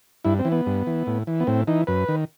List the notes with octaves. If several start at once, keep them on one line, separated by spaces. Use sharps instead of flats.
G2 E4
C4
E3
B3
G2
E3
A2
E3
B3
A2 C4
E3 D#4
F#2 B4
D#3